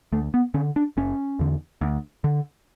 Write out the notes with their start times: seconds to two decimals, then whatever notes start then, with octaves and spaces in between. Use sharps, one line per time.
0.12 D2 A3
0.34 B3
0.54 D3 C#4
0.76 D4
0.97 F#1 C#4
1.39 E2 D3
1.81 D2
2.24 D3